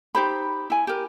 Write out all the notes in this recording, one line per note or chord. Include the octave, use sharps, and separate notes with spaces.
D#4 G4 C5 B5
E4 G#5
G4 A#4